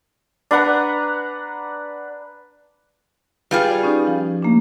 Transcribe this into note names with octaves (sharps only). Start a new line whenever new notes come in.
D4 B4 F#5 A#5
G3 F4 G#4 B4
D5
C#4 D#4 G4
F3
A3 A#3 D4